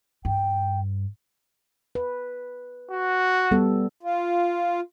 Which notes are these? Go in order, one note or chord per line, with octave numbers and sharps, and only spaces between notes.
G2 G5
B4
F#4
G3 B3 A4
F4